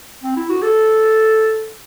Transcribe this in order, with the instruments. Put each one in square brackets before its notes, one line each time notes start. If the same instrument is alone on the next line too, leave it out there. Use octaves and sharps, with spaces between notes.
[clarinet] C4
E4
F#4
A4